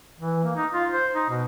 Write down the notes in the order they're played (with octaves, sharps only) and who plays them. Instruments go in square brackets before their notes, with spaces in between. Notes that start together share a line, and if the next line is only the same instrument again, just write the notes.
[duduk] E3
A#3
D#4
F4
C5
D#4
B2